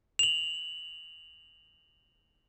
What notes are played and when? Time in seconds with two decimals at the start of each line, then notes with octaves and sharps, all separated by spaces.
0.19 F7 F#7